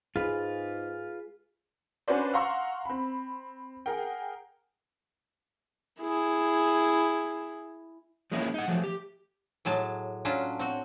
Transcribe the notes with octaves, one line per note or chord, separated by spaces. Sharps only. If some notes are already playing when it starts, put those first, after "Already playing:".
G#2 F4 G#4 B4
C#4 D4 F#4 B4 C5 D5
F5 F#5 A#5 C6 C#6 E6
C4 B5
G#4 A#4 F#5 G5
E4 G#4
F3 G#3 A#3 C#4 E4
D#4 F#5
F3 F#3 A3
G4
A2 F#3 G#3 A5
F#3 C#4 D4 F4
C4 F#4